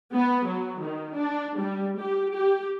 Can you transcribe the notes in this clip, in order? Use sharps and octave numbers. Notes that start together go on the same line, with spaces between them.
B3
F#3
D#3
D4
G3
G4
G4